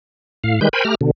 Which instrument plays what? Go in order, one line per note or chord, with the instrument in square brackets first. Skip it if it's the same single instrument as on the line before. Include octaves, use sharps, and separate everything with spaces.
[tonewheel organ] A2 F5
D#3 G3 G#3 B4 G6
A#4 C5 G5 G#5 B5
A3 G4 A#5 F6
B2 D3